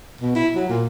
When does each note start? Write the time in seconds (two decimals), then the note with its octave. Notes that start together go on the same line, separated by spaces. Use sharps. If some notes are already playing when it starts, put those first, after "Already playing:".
0.21 B2
0.35 E4
0.55 F#3
0.69 A#2